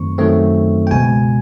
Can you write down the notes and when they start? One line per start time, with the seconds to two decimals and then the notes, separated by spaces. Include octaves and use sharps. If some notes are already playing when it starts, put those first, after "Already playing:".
Already playing: F#2 D#3 F#3 A3 C4 C#6
0.18 F#2 D#3 F#3 A3 C4
0.87 G5
0.91 C#2 B2 G#3 G#5